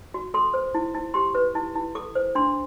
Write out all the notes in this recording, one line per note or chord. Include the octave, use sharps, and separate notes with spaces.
F#4
A4 C6
C5
E4
E4
G4 C6
B4
E4
E4
A4 D6
C5
D4 C6